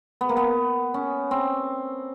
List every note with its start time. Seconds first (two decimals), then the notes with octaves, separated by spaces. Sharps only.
0.21 B3
0.29 A#3
0.37 B3
0.94 C#4
1.31 C4